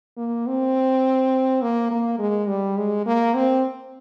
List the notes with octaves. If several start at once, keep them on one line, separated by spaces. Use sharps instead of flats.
A#3
C4
A#3
A#3
G#3
G3
G#3
A#3
C4